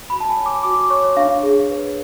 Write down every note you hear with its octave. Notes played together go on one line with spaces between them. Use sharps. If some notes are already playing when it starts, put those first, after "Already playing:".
F#4 B5
A5
G#5
C#5
D6
F#4 D6
C#5 C#6
D4 F5
G#4
B4